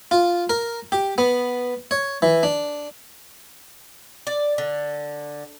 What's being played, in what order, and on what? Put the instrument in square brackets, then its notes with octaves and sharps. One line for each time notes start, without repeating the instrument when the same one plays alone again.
[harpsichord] F4
A#4
G4
B3
C#5
E3
D4
[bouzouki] D5
D3